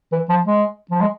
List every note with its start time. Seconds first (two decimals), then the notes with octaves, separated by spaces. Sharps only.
0.12 E3
0.29 F3
0.47 G#3
0.91 F3
1.01 G#3